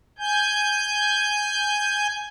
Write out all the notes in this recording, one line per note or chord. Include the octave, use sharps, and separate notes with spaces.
G#5 G6